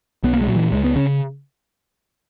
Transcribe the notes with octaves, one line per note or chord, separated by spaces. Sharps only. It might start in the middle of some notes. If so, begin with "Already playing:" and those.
B1 B3
A#3
G#3
A#2 F#3
E3
C#2 G#3
B3
C#3 C#4